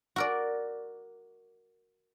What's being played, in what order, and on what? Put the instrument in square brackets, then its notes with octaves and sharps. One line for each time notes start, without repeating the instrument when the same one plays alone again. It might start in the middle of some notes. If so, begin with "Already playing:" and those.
[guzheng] F#4 A#4 D5